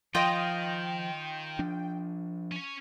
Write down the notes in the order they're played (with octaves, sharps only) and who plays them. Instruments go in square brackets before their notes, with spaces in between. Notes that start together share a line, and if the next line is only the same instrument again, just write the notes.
[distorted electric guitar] D#3 [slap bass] F3 [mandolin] F4 D#5 [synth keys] G5
[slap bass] F3 D4
[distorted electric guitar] C#4 C#5